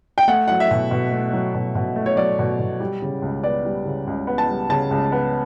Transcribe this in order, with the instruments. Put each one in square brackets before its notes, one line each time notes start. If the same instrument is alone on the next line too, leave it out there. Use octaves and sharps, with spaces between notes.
[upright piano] G5
A3 F#5
F#3 F#5
E5
B2
B2
A3
F#3
B2
B2
A3
C#5
F#3 D5
B2
B2
G3
C#3
C#2
B3 D5
G3
C#3
C#2
B3
A5
G3
C#3 A5
C#2
B3